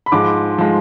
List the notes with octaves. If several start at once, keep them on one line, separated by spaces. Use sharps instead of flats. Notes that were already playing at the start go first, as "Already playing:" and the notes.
B5
G#2 F3 G#3 D6
F3 G#3